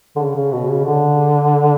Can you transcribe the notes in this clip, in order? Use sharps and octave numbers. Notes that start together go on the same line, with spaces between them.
D3
C#3
C#3
B2
C#3
D3